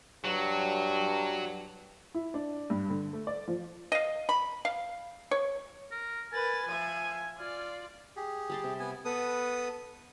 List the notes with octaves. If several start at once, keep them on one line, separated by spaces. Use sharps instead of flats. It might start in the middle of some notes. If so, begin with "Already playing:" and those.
G2 F#3
E4
D4
G2
D3
A3
D5
F3
D#5 F5
B5
F5
C#5
A#4
A#4 B4 G#5 A6
F3 E5 D#7
F4 D5 F6
G4 G#4
G3 A5 C6
C3
B3 G#5
B3 A4 B4 D#6